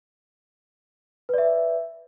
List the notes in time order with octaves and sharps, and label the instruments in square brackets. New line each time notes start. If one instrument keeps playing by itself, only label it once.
[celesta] B4
D5
E5